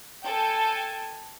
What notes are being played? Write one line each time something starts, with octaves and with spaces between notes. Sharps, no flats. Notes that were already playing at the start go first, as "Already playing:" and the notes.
A4 G5 G#5